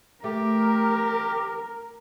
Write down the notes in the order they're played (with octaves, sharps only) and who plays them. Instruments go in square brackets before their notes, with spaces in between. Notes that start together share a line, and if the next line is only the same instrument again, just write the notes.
[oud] A3 [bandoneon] G4 [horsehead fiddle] A#4